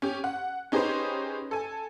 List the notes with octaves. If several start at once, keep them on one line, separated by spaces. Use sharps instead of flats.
C#4 G4
F#5
C#4 D#4 G4 G#4 B4 C5
A4 G#5